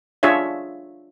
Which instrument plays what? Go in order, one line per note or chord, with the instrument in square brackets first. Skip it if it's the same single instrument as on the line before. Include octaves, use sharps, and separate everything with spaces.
[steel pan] D4 F4 G#4 C#5 E5